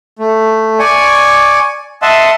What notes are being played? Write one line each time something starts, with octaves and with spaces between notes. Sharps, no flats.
A3
D5 G#5 C#6
D#5 E5 F#5 A5 C6